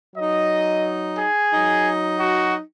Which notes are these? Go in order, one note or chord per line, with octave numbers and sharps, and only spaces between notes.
F#3 D#4 D#5
G#4
F#3 D#4
F#4